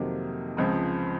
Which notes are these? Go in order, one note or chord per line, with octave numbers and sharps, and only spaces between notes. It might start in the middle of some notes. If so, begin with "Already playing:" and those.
Already playing: F2 C3 D#3 F#3 A#3
C#2 C#3 F3 C4